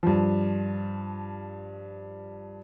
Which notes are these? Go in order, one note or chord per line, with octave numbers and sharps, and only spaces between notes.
G2 F3